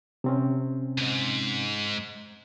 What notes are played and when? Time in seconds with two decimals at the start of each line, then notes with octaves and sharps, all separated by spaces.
0.24 C3 C4 C#4
0.98 D#2 G#2